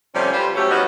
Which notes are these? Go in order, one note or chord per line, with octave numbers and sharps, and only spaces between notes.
C3 F3 G3 A3 C#4
F4 G4 B4 C5
F#3 A3 C4 C#4 F#4 G4
F3 G3 B3 C#4 D#4 F#4